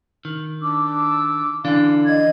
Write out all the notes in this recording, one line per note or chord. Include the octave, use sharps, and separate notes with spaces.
D#3
D4 D6 E6
D3 E3 D4 F5
D#5 G#6